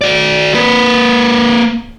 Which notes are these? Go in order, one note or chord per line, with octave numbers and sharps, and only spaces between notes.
F#4 D5
A#3 B4